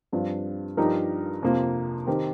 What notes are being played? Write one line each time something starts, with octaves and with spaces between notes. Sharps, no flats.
G2 F3 C4 F4
G2 F3 D#4 G4 A#4
F2 C3 F3 A#3
D#3 C4 G4 A#4